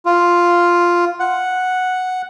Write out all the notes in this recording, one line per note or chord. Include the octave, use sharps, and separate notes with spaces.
F4
F#5